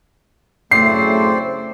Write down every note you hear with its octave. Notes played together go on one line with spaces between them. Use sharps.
F#2 A2 C#3 A3 C4 C5 D5 C7